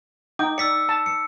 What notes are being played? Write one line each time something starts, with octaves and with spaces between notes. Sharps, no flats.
D#4 G5 D6
D5 E6 B6 C#7
A5
C#7